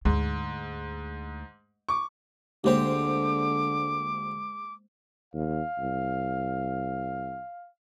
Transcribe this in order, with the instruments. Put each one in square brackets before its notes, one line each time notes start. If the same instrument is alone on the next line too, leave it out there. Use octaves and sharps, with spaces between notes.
[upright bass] D2 [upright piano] G#2
[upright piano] C#6 D6
[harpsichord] D2 C4 G4 [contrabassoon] D3 [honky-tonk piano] G#3 A#3 C5 [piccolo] D6
[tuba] D#2 [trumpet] F5
[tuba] C2